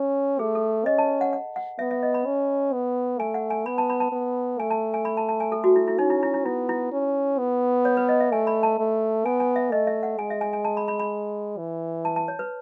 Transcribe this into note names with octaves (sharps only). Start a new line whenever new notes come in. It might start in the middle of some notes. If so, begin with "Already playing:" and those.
Already playing: C#4
A3 G#4
A4
C#4 D#5
A5
F#5
F#5
F#5
B3 E5
E5
D#5
B5
C#4
B3
A3 G#5
F#5
G#5
B3 B5
A5
B5
A5
B3
A3 G#5
A5
G#5
B5
A5
A5
G#5
A4
F#4
E4
E4
C#4 D#4
E4
E4
E4
B3 E4
E4
C#4
B3
C#5
B4
D#5
E5
A3 G#5
B5
A5
A3
B3 G#5
G#5
E5
A3 D#5
E5
F#5
G#3 G#5
E5
G#5
G#5
A5
B5
B5
B5
E3
A5
A5
C#5
B4